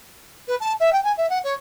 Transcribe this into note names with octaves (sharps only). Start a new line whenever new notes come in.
B4
A5
E5
G5
G#5
E5
F#5
C#5